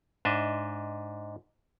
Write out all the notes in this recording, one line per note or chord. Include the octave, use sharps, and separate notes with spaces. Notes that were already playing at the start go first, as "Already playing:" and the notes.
G#2 D4 D#5 E5